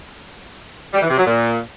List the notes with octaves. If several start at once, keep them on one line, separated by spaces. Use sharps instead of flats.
G3
E3
C3
F#3
A#2